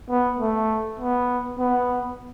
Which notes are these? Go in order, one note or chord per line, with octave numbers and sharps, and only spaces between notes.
B3
A3
B3
B3